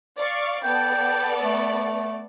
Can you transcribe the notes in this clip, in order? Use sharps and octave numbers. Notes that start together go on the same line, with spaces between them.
D5 F5 C#6
B3 A4 D5 G5
A3